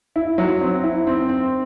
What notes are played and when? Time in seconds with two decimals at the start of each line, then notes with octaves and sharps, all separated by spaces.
0.16 E4
0.38 F#3
0.61 C4
0.84 E4
1.07 C4
1.29 C4